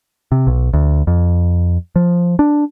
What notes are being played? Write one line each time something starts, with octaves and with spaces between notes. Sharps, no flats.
C3
B1
D2
F2
F3
D4